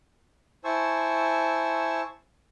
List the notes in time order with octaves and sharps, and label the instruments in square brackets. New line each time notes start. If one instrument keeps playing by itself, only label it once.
[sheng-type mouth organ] E4 C5 G#5 A5 C#6 E6